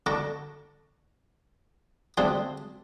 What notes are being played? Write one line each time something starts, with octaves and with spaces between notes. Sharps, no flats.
D3 D4 A#5 C#6 D6
D3 A3 C4 D4 G#4 C6